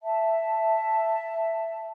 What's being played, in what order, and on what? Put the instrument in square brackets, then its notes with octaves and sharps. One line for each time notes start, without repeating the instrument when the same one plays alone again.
[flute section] E5 A5